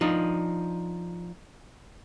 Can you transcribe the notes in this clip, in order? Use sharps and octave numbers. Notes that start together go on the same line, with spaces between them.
F3 D4 D#4